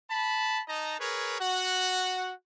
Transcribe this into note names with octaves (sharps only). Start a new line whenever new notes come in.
A5 B5
D#4 D#5 A5 A#5
G#4 A#4 B4 C#5
F#4 F#5